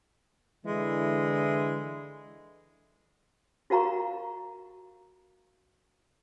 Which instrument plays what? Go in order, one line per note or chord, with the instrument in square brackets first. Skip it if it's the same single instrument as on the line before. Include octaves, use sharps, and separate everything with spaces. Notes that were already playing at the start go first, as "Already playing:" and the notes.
[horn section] D3 E3 G#3 E4
[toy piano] F4 F#4 A#4 F5 A#5 C#6